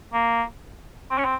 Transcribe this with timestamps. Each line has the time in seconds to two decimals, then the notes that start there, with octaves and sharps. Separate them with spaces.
0.13 A#3
1.11 C4
1.18 C#4
1.25 C4